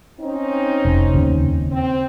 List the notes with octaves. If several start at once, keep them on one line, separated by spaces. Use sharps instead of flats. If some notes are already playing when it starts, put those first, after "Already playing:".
C4 C#4 D#4
F1
D#2 C#3
C4